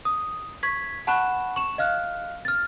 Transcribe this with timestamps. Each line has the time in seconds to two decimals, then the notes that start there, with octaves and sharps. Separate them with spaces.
0.05 D#6
0.63 C#6 G#6 B6
1.07 F#5 A5 B5 C#6 F#6 E7
1.56 C#6 E7
1.78 D#5 F5 F6 F#6
2.45 F6 A6